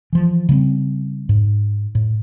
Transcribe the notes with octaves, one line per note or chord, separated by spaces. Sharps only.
E3 F3
C#3 G3 G#3 C4
G#2
A2